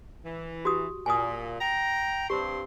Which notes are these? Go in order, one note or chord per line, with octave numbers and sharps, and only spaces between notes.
E3
F#4 G4 D#6
A#2 G#5 D#6
G5 A#5
G2 C4 G4 C6